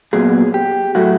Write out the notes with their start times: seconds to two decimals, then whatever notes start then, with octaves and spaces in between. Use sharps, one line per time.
0.13 A#2 F#3 B3 G#4
0.54 G4
0.95 A2 F#3 A3 F#4